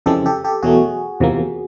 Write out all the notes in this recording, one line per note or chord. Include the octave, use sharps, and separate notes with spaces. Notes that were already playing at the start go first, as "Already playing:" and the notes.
F2 C#3 E3 G#3 C4 G4 A4
G4 A4
G4 A4
E2 B2 F#3 A3 F#4 G#4
E2 C3 F3 A#3